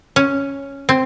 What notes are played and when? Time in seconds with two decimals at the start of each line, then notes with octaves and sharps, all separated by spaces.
0.16 C#4
0.89 C4